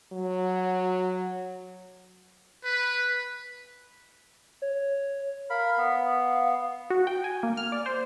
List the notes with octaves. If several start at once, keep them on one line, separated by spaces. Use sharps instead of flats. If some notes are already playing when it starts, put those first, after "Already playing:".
F#3
B4
C#5
A#4 F5 B5
B3
F#4
G5
G#5
A#3
F6
D5
C5